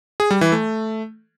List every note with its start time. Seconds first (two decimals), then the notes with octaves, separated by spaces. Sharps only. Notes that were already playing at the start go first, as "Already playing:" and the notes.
0.20 G#4
0.31 G3
0.41 E3
0.52 A3